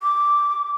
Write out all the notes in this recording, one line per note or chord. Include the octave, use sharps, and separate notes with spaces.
D6